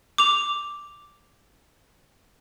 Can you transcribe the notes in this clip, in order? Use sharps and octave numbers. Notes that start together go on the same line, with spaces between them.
D6 F7